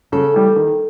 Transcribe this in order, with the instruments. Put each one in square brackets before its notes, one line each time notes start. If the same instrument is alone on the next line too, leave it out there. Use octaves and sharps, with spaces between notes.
[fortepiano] C#3 [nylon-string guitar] A4
[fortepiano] E3 G3
D#3